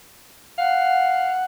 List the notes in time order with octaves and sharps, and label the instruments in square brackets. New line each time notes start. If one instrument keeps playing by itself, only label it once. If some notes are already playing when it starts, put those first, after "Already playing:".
[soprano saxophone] F5 [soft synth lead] F#5